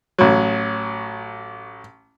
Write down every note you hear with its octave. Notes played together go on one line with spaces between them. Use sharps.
A1 F#3